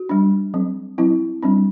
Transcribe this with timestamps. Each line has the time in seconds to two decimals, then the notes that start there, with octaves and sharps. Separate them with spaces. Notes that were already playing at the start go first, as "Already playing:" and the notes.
Already playing: F#4
0.09 G3 D4
0.54 F#3 C4
0.98 F#3 C4 E4
1.43 G3 C4 D4